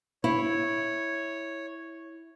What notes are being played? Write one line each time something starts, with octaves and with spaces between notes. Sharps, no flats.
E4 C#5